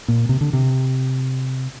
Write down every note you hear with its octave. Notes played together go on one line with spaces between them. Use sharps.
A#2
C3
D3
C3